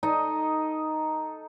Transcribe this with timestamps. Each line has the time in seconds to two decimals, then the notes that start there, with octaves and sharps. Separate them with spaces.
0.03 D#4 A4 D#5